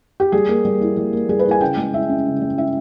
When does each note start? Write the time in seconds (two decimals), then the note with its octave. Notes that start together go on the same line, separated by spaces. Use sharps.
0.20 G4
0.32 G3 G#4
0.49 A#3
0.65 G3
0.81 E4
0.97 G3
1.13 A#3
1.29 G3 G#4
1.39 B4
1.45 E4
1.51 G#5
1.61 C#3 G5
1.77 G#3
1.93 E4 E5
2.09 C#4
2.26 C#3
2.41 G#3
2.58 E4 E5